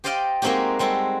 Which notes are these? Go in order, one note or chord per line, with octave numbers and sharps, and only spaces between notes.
G4 C5 D5 D#5 F5 G5
G#3 A#3 C4 D#4 F#4 G4
G3 G#3 C4 F#4 A4